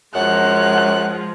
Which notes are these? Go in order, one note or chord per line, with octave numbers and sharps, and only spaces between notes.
F#2 F3 G#3 F#5 F#6